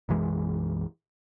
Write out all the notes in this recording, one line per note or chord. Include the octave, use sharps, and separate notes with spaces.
B1 F#2 E3 G#3